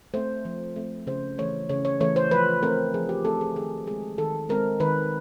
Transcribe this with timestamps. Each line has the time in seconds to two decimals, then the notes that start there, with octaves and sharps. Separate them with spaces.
0.14 A3 C4 C5
0.45 F3
0.76 A3 C4
1.07 C#3 C5
1.38 E3 A3 C#5
1.69 C#3 C#5
1.85 C#5
2.00 E3 A3 C#5
2.16 C5
2.31 F3 B4
2.63 A3 C4 A#4
2.94 F3 G#4
3.09 G4
3.25 A3 C4 A4
3.41 G#4
3.56 D#3 G#4
3.87 G#3 C4 G#4
4.18 D#3 A4
4.49 G#3 C4 A#4
4.80 D#3 B4